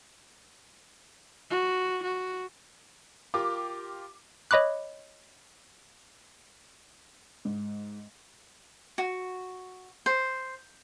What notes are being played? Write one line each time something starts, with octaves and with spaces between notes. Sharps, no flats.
F#4
F#4
F4 G4 A#4 D6
C#5 D#5 B5 D6 F#6
G#2
F#4
C5